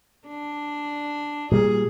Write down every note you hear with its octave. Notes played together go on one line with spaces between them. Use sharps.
D4
A#2 G3 G#4